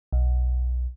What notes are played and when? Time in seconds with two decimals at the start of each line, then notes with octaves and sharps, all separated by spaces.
0.13 B1